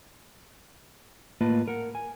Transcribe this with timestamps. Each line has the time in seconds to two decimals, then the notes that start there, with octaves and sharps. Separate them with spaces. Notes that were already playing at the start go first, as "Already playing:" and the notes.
1.41 A2 A#3 F4 B4 D#5 A5
1.68 A#4 F#5
1.95 G#5